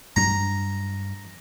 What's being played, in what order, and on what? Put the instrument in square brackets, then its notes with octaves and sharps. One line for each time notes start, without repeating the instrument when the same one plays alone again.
[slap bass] G2 F#3 D4 [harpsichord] A#5